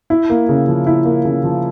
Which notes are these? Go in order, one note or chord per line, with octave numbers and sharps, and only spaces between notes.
E4
A#3
C#3
F3
E4
A#3
C#3
F3